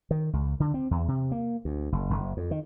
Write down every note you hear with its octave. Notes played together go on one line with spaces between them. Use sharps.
D#3
C#2
D3
C4
E2
C3
A#3
D2
F#1
F#1
F2
D#3